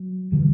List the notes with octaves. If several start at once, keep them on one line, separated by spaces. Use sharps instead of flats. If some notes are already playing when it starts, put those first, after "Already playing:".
Already playing: F#3
D3 E3 G3